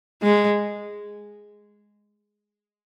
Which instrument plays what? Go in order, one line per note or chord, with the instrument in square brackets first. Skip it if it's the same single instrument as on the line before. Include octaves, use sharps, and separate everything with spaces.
[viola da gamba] G#3